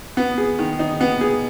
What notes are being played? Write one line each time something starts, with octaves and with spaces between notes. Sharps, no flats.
B3
G#4
D#3
D#4
B3
G#4